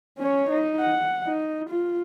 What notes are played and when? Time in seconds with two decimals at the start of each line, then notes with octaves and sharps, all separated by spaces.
0.19 C#4 C#5
0.50 D#4
0.80 F#5
1.27 D#4
1.70 F4